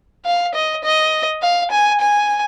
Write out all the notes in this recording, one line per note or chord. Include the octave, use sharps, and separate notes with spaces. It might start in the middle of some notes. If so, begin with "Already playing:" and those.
F5
D#5
D#5
F5
G#5
G#5